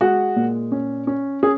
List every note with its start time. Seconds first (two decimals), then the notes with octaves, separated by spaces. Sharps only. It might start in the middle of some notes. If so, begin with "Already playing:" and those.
0.01 G#3 F#4
0.36 A#2
0.72 C#4
1.07 C#4
1.43 C#4 G#4